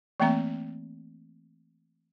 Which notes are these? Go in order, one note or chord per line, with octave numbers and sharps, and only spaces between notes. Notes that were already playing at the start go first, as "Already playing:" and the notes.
E3 A3 A#3 C4 E5 A#5